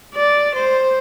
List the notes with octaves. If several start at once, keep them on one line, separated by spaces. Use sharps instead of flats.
D5
C5